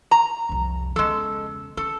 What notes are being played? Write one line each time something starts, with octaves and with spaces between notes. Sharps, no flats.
A#5
C2 F2
E2 C#3 G#3 A4
C#4 A4